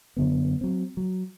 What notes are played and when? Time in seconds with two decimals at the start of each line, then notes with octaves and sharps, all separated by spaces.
0.17 F#2 D3 B3
0.61 F#3 C4
0.97 F#3